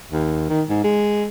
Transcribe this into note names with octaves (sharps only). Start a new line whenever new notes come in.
D#2
D#3
G#2
G#3